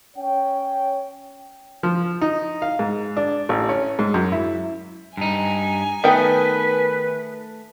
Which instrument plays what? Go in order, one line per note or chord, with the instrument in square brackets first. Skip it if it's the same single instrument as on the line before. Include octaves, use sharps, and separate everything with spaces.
[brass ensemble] C#4 C#5 G5
[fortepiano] F3
D#4
F5
G#2
D4
A1
C#4
G#2
F#2
E4
[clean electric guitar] G2 D#4 [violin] G#5
[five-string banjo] D#3 B3 G5 [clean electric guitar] A3 [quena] B4